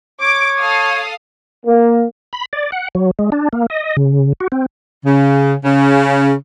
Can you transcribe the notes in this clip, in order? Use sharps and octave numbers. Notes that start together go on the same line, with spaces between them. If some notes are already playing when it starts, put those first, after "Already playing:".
C#5 D6
A4 F5 D#6
A#3
B5
D5
F#5
F#3
G#3
D4
A#3
D#5
C#3
F#4
C4
C#3
C#3